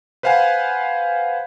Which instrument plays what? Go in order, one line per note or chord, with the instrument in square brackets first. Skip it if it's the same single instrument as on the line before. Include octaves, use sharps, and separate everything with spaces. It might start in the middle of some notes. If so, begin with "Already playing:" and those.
[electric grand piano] B4 C5 F5 F#5 G#5